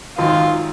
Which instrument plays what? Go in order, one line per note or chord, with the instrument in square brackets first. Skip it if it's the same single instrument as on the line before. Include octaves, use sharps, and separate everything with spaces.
[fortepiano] G#1 F#2 D#3 [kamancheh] F4